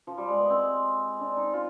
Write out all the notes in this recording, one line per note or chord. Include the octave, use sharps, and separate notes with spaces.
F3
G3
G#3
B3
C4
D4
D#4
F4